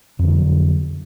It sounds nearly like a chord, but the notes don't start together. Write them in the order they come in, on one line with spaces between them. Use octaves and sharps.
F2 D3 E3 F#3